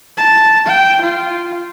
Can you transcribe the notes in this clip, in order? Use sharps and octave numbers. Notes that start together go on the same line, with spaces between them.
A5
G5
F4